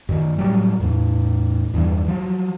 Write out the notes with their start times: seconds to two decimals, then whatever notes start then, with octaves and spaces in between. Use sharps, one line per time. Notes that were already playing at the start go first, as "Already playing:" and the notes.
0.09 F#2 D#3
0.38 A2 F#3 G3
0.80 E2 A2
1.74 E2 G2 E3
2.08 F3 F#3